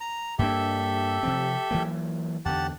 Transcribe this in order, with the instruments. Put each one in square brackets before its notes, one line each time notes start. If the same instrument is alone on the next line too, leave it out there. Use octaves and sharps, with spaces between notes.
[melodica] A#5
[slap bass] G2 A#3 D4 [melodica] G4 A4 E5
[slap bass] C3 F3 C4
E3 F#3 A#3
[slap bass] E2 D3 [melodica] G4 F#5 A5